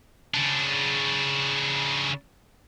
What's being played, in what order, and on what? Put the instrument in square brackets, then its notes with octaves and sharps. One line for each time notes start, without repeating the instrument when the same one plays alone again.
[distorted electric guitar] C#3 D4